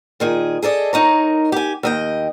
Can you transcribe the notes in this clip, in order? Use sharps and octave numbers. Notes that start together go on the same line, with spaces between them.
A#2 D#3 G#4
G#4 A4 D5 D#5
D#4 A#4 C#5
G4 G#5
D#2 D#5 G5